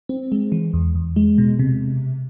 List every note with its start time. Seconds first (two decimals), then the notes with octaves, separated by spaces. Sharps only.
0.09 C4
0.32 G#3
0.52 E3
0.74 E2
0.95 E2
1.16 G#3
1.38 B2
1.59 C3